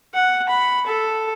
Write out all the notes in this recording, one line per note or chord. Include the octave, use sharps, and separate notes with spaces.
F#5
B5
A4